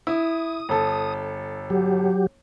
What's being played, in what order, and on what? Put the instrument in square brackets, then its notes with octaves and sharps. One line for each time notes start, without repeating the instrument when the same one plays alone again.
[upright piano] E4 [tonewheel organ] D#6
[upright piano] G1 A4
[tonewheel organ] F#3 G4